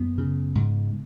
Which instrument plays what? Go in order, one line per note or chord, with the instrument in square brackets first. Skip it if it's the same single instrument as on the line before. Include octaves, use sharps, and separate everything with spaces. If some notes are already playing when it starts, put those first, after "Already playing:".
Already playing: [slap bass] F#2 B3
C#3
G#2